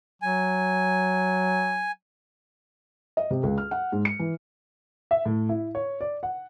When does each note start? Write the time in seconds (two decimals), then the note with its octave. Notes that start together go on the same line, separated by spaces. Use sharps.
0.22 F#3 G#5
3.17 D#5
3.30 C3
3.43 C#2
3.58 F6
3.71 F#5
3.92 G#2
4.05 C#7
4.19 E3
5.11 E5
5.25 A2
5.49 E4
5.75 C#5
6.01 D5
6.23 F#5